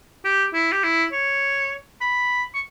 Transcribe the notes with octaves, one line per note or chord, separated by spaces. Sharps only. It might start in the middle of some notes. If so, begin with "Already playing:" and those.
G4
E4
G4
E4
C#5
B5
C#6